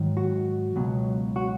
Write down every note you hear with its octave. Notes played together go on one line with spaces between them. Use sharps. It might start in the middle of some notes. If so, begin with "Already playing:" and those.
Already playing: G#2 D#3 F#3
F#4
C#2 B2 F#3
F#4